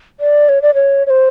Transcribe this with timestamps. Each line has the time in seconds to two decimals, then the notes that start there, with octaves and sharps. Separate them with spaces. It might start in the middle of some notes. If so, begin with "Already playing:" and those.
0.20 D5
0.49 C#5
0.62 D5
0.74 C#5
1.07 C#5
1.10 C5